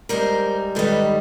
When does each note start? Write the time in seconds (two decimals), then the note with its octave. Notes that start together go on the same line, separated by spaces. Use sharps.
0.09 G#2 D#3 G3 A#4 C5
0.75 G#2 D#3 G3 A4 B4